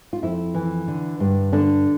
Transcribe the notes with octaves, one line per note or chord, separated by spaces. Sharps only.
F4
F2 E4
E3
D3
G2
D3 D4